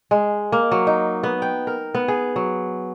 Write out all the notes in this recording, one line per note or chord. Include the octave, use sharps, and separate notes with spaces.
G#3
A#3
F#3
D#4
B3
G5
A#4
B3
G#4
F#3